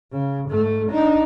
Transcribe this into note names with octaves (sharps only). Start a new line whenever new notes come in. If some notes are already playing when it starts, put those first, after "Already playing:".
C#3
G#2 A3
D4 D#4